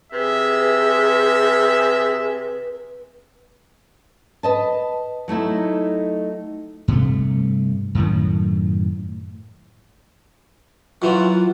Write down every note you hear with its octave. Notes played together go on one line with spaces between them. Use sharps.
C3 G#4 B4 E5
B4 D#5 A5
F#3 A3 D#4 E4
G2 C3 A3
F#2 A2 D#3
F#2 E3 F#3 F4